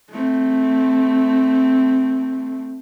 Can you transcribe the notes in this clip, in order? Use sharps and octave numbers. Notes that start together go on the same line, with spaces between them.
A3 C4